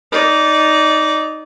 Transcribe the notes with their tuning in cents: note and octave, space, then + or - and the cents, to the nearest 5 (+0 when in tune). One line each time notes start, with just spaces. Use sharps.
D#4 +0 D5 -20